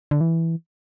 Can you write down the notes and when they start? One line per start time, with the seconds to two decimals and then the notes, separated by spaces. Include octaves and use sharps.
0.11 D3
0.21 E3